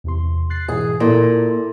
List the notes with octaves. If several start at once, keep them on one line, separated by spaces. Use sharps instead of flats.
E2 C3 C6
F#6 A6 C7
G#2 B2 E3 G#4
A#2 E4 A4